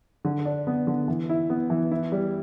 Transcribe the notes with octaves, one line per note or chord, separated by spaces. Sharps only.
D3
D4
B3
D3
E3
E4
B3
E3
E4
G3